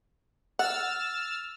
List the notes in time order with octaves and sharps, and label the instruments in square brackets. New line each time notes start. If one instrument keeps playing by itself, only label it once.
[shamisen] F#5 [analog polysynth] E6 F6 A6